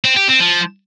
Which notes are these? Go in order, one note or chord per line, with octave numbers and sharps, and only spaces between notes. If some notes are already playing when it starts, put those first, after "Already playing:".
C4
G4
C4
F3